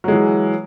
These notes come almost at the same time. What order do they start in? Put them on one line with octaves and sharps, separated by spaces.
F#3 G#3 E3